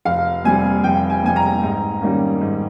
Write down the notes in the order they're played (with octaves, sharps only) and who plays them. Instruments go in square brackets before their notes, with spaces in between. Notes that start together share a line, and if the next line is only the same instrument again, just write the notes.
[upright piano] F1 F5
F2 C3 G3 G#5
F1 G5
G#5
F2 C3 G3 G#5
A#5
G#2
D#3 G3 A#3 C#4
G#2